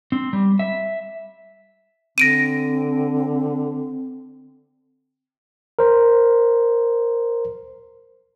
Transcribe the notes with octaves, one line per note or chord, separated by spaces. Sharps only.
C4
G3
E5
D3 C4 A#6 D7 D#7
A#4 C5